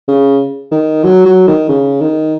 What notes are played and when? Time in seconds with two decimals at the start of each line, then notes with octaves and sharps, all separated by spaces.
0.08 C#3
0.71 D#3
1.04 F#3
1.26 F#3
1.47 D#3
1.69 C#3
2.01 D#3